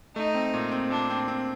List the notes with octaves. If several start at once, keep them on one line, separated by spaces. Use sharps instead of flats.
A3 D#4
C4
A#2
C4
A#2 D4
C4
C4